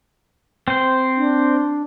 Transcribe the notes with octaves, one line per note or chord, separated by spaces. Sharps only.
C4 C5
D4